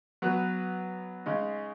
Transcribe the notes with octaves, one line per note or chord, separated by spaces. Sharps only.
F#3 B3 F#4 B4
C#3 G#3 D#4